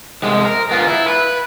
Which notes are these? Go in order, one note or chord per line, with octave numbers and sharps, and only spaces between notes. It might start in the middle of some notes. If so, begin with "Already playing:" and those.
C2 G#3
A#4
B3 F4
E4
B4